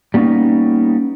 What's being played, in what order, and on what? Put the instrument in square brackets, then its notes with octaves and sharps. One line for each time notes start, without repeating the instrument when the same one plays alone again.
[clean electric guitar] G3 A#3 B3 C#4 D#4